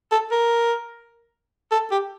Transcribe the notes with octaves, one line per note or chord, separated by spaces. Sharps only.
A4
A#4
A4
G4